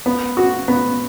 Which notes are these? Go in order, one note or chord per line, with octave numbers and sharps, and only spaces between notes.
B3
F#4
B3